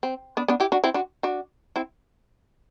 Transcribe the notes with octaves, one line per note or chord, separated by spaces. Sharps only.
C4
B3 D4
B3 D4
E4 G4
D4 F#4
C4 E4
D4 F#4
D4 F#4
C4 E4